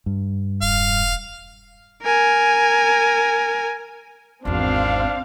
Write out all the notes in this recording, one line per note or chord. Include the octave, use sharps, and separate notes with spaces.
G2
E1 F5
A#4 G#5
G#1 E2 C4 D4 F5